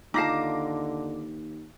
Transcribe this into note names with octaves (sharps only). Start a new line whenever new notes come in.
D#2 D3 D#4 F4 A5 D6 A#6 C7